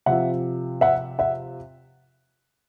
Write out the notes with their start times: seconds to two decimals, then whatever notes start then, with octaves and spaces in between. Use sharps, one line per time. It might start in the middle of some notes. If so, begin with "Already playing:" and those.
0.06 C3 F3 E5 F#5
0.81 E5 F#5
1.19 E5 F#5